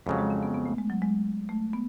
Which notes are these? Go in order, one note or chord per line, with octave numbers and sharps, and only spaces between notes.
F2 C#3 F#3 G#3
G#3
C#4
B3
B3
A3
G#3
F#3
G#3
A3
B3